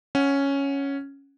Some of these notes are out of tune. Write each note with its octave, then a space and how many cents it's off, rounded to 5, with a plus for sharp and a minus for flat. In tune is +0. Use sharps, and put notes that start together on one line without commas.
C#4 +0 F#5 +0